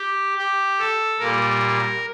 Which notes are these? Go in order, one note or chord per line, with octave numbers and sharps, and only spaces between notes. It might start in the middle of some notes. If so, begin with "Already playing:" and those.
Already playing: G4
G4
A4
A#2 G3 A#3 A#4